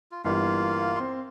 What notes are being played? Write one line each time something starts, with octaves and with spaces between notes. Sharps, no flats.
F4
G1 E3 G3 A#3 F4 F5
C4 C6